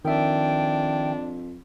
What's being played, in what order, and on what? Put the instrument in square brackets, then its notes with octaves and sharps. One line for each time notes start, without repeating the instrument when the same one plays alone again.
[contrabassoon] F2 [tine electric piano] D#3 E5 [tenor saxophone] D4 [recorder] G5